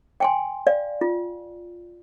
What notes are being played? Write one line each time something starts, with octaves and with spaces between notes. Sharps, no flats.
G5 G#5 C6
D5 F5
F4